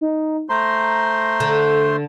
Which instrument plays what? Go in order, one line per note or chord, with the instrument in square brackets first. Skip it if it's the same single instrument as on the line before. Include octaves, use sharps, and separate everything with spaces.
[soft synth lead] D#4
[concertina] A3 C5 C6 [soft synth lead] A#5
[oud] D3